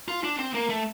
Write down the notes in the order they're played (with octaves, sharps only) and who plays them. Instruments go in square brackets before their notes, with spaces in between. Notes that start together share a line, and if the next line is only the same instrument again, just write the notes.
[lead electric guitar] F4
D4
C4
A#3
A3